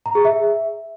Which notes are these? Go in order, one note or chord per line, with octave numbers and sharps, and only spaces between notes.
A#5
G#4
E5